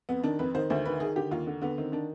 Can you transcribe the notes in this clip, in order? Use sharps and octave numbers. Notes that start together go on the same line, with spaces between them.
F2 B3
D#3 D4
F2 B4
D#3 C5
D2 C5
D#3 B4
D#3 G#4
D3 G4
D#2 F4
D3
D3 B3
D#3 C4
D#3 D4